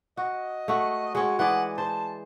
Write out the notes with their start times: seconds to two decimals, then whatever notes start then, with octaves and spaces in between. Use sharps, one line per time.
0.17 F#4 D#5
0.68 A3 F#4
1.15 G#3 C#4 F#4
1.39 E3 D5 D#5 F#5
1.78 C5 A5